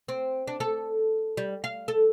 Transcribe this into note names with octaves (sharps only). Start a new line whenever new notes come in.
C4
D4
A4
G3
F5
A4